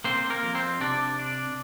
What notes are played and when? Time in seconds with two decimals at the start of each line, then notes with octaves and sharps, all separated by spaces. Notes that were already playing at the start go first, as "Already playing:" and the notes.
0.04 A#3 C4 C5
0.30 A#3 A#4
0.43 F2
0.55 C4 C5
0.80 C3 D4 D5
1.19 D4